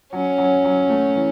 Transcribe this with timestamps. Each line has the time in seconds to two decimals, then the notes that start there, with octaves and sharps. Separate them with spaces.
0.13 F#3 C#4
0.38 F#3
0.64 F#3
0.90 A3
1.16 E3